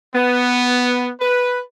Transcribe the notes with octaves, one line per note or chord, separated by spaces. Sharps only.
B3
B4